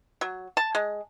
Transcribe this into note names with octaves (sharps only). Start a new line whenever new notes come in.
F#3
A5
G#3